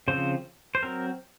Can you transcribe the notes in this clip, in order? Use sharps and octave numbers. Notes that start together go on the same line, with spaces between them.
C#3 F3 C4 C5
C5
F#3 C4 A#4